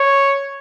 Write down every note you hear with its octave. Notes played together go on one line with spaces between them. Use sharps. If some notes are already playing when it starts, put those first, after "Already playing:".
Already playing: C#5